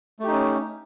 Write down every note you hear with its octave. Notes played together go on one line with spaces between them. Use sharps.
A3 C#4 D#4 G4